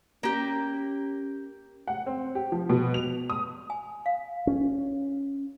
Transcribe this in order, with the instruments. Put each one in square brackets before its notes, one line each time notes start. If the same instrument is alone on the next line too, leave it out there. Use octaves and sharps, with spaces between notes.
[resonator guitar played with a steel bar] A#3 G4 [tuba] C#4
[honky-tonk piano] F#5
C4
G4
F3
B2
F7
D#6
[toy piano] G#5
F5
[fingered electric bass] C#4